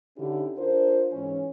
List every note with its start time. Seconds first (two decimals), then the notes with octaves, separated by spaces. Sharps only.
0.17 D3 C#4 D#4 E4 G4
0.57 D4 F4 A#4 C5
1.12 G#2 E3 C#4